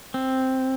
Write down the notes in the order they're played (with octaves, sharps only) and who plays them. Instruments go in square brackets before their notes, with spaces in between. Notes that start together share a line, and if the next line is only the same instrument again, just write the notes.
[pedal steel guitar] C4